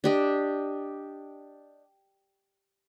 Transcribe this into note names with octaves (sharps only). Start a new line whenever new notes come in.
D4 G4 D#5